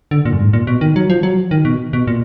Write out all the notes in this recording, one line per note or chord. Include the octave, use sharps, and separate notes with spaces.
D3
A#2
F#2
G#2
A#2
B2
D#3
F#3
F3
F#3
D#3
B2
B2
A#2